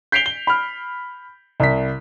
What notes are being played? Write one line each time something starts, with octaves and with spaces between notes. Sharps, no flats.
G6 B6 C7 D7 F7 G7
G7
B5 F6
C2 B6